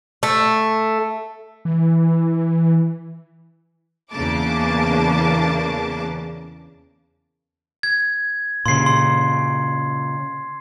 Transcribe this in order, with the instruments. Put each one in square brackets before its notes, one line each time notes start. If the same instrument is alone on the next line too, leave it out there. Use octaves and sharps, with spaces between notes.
[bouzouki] A3
[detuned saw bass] E3
[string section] E2 C#3 A#3 D4 A5 D6
[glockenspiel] G#6
[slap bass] A#2 C#3 [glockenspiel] C6 C7
[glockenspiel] C6